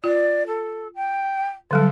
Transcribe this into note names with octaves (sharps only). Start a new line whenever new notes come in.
F4 D5
A4
G5
D3 F#3 G3 A4